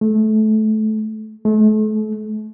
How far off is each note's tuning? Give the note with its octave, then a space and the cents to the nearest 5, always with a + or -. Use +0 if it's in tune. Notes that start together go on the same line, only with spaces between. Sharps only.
A3 -20
A3 -35